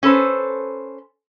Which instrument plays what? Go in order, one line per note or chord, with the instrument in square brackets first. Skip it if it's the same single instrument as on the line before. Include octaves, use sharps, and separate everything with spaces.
[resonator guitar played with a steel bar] C#4 A4 B4 C5